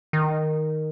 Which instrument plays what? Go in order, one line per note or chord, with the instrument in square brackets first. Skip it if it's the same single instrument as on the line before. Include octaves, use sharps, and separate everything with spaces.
[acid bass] D#3